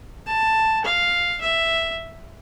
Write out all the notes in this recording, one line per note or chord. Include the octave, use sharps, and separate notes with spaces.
A5
F5
E5